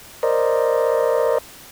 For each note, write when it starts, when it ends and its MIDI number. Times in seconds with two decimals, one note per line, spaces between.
0.23 1.38 70
0.23 1.38 72
0.23 1.38 74
0.23 1.38 75